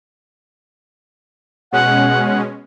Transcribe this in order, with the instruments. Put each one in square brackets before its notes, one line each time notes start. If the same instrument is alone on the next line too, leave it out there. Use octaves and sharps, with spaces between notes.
[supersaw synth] B2 G#3 C#4 [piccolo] F#5